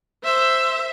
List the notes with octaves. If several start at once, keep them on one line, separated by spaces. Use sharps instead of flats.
C5 E5